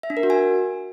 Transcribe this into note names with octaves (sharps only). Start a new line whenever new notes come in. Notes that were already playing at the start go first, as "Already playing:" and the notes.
E5
D4
A#4
F#4
G#5